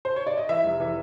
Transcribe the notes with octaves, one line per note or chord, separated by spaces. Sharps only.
C5
C#5
D5
D#5
E3 E5
F1
E3